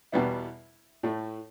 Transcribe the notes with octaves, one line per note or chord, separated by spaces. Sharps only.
E2 B2 G3 B3 E4
A2 A3